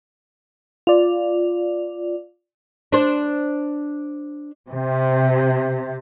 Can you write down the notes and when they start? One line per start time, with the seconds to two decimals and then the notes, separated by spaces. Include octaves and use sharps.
0.87 F4 D5
2.92 D4 C5
4.70 C3